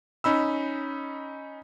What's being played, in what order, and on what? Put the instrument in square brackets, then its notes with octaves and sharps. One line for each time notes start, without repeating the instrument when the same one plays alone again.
[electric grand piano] C#4 D#4 B5 E6